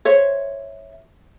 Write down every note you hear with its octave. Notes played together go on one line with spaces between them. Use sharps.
C5 C#5 E5